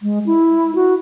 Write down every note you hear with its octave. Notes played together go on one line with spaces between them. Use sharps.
G#3
E4
F#4